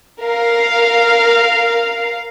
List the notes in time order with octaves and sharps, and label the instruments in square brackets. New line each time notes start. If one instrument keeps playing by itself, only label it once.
[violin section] A#4 F5